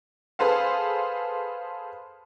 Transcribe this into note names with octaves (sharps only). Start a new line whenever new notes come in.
G#4 A4 B4 C5 F5